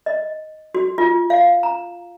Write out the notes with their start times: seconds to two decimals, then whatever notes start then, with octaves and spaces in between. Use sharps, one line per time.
0.06 D#5
0.75 F#4
0.98 F4
1.30 F5
1.63 A#5